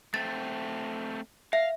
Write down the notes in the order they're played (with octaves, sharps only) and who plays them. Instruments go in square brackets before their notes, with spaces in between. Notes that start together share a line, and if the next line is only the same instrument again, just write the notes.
[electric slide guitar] A3 C4 [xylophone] A6
[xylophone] E5 [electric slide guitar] F5